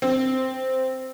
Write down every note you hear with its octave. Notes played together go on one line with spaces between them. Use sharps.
C4